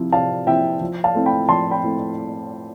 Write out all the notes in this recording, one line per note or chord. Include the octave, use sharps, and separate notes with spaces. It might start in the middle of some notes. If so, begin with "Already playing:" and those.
Already playing: C3 F3 C4 E4
C3 F5 A5
F3 C4 E4 E5 G5
F3
F5 A5
A3 C4 E4
G5 B5
F3 A5 C6
G5 B5
A3 C4 E4